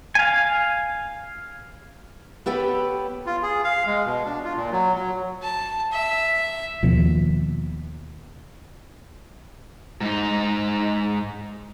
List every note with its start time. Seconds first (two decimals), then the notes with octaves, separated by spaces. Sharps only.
0.15 F5 G#5
2.46 B3 G4 A4 B4 C#5 G5
3.26 F4
3.43 G#4
3.64 F5
3.86 G#3
4.05 B2
4.25 D4
4.44 F4
4.56 A#2
4.72 F#3
4.94 F#3
5.42 A5
5.92 E5
6.83 D#2 B2 F3
10.01 G#2 D#4